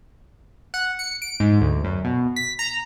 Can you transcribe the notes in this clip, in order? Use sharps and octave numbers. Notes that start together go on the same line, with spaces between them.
F#5
C#7
D7
G#2
D2
F#2
B2
B6
A#5